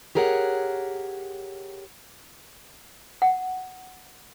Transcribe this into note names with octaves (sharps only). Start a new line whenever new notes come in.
G4 G#4 A#4 C#5 F5 F#5
F#5